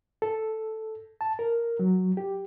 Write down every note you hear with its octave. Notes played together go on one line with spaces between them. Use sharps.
A4
A5
A#4
F#3
G4